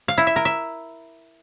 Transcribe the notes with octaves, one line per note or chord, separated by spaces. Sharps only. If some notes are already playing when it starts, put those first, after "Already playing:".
F5
E4
E5
A#4
E5